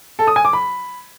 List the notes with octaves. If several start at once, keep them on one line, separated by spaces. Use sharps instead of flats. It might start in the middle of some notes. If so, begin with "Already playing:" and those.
A4
D#6
G#5
D6
B5